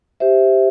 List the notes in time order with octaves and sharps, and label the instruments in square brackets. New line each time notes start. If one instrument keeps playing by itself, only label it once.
[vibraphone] G4 C5 E5